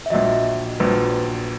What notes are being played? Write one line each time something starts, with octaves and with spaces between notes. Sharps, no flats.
E5
A#1 A#2 F#3 D#5
A#1 A#2 F#3 B4